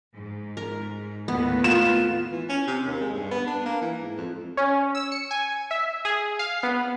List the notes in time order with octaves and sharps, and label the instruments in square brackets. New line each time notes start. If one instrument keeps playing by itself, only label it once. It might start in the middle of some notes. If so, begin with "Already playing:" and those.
[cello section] G#2
[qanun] A#4
[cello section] D#2 A2 B4 [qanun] B3
[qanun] B3 [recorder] F4 [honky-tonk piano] E7
[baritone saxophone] E3
C#4
C3
D#2
G#3
G2
B3
D4
A#3
E3
G#2
F2
[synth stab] C#4
E6
C#7
G#5
E5
G#4
F5
B3